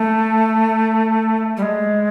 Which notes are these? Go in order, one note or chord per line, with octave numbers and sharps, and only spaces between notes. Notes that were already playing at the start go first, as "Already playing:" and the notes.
Already playing: A3
G3
G#3